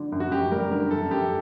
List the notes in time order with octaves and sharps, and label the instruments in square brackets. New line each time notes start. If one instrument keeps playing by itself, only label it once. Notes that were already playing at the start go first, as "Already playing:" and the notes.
Already playing: [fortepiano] D3
F#2
[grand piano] F#4
[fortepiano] F#2 [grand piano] G4
[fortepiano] G3 [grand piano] A#4
[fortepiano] D3 [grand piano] A#4
[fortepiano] F#2 [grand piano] A4
[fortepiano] F#2 [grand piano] G4